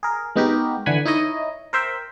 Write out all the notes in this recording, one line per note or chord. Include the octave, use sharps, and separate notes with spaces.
G#4 A#4
G#3 B3 D#4 F#4 G4 A#4
D3 E3 F#5 G#5 B5
D#4 E4 C#5 D#5
A#4 C5 E5 G5